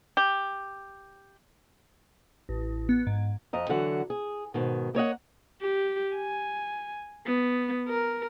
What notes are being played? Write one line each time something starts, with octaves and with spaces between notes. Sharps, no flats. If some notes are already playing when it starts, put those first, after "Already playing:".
G4
A1
B3
G#2
F2 D#5 A#5
D3 E3 F#3 F#4 F#5
G#4
G#2 B2 D#3
A#3 C#5 D#5 F#5
G4
G#5
B3
A#4